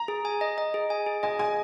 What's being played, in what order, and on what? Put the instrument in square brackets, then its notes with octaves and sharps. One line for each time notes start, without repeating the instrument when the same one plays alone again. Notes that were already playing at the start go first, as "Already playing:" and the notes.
Already playing: [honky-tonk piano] A#5
[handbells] G#4
G#5
D#5
D#5
G#4
G#5
G#4
[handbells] D#5 [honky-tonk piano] G#5
[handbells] G#4 [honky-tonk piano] G#5